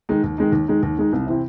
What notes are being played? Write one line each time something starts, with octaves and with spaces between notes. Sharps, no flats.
D#3 G#3 D#4
D#2
D#3 G#3 D#4
D#2
D#3 G#3 D#4
D#2
D#3 G#3 D#4
C2
C3 E3 C4 E4